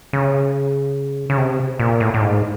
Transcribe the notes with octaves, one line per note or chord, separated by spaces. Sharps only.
C#3
C#3
C3
A#2
A2
A2
G#2